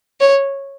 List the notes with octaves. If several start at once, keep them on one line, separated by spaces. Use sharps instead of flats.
C#5